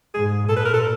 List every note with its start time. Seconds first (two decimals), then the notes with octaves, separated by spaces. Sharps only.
0.15 G#2 G#4
0.49 A#2 A4
0.57 B4
0.65 A#4
0.74 A4